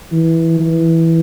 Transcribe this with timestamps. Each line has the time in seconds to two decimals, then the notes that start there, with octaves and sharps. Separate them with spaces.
0.12 E3
0.60 E3